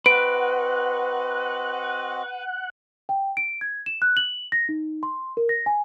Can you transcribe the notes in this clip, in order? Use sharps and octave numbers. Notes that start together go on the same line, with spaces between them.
C4 F#4 B4 D#5 F#5 D7
G5
D7
G#6
E7
F#6
F#7
A#6
D#4
C6
A#4
A#6
G#5